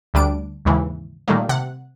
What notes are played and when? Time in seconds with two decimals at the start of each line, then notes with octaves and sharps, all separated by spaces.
0.14 D2 G3 D4 D7
0.65 D#2 G#2 C#3 E3
1.28 A#2 D#3 G3 A3 A#3
1.49 C3 F#5